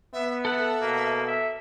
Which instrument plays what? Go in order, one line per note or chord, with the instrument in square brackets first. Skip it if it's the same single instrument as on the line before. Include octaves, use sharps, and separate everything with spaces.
[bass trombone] B3 [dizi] E5
[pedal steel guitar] A4 F#5 [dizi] E5
[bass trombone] B2 [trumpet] A#3
[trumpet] E5